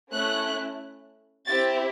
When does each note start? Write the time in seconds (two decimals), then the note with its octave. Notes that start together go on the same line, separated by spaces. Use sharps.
0.11 A3 C#4 E4 F#6
1.46 C4 E4 G4 A6